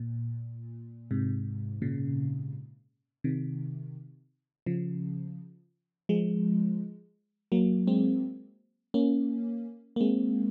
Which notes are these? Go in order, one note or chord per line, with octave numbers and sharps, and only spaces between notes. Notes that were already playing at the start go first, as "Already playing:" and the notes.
Already playing: A#2
G#2 C3
A#2 C#3
C3 D#3
C#3 F3
F3 G#3
F#3 A#3
G#3 C4
A#3 C#4
A#3
G#3 C4